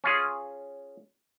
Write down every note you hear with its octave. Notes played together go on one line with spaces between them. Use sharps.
C#4 F4 G#4